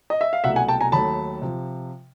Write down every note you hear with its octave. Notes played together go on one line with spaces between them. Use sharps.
D#5
E5
F5
C2 B2 F#3 A3 E5 F#5
F#5 G#5
G5 A5
G#5 A#5
D#2 D#3 F#3 A3 A5 B5
C3 F3